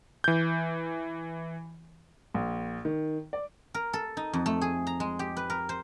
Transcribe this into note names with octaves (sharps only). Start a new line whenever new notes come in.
E3 G6
A#1
D#3
D5
A#4
A4
D#4
F2
A3
G#4
A#5
G#3
G4
B4
A#4
C5